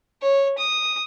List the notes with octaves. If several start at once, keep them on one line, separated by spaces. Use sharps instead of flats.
C#5
D#6